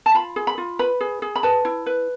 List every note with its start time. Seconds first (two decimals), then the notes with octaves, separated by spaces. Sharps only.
0.06 A5
0.15 F4 B5
0.36 G#4
0.47 B5
0.58 F4
0.79 B4 B5
1.01 G#4
1.22 G#4
1.36 B5
1.43 B4 A5
1.65 E4
1.86 B4